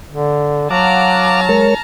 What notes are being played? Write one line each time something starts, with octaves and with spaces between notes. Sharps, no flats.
D3
F#3 F5 F#5 A5 A#5 D6 F6
G#3 A#4 C#5